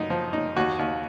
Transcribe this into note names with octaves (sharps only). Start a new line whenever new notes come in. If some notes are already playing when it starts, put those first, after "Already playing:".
Already playing: F#2 D#4
F3
D#4
D#2 F#4
D#2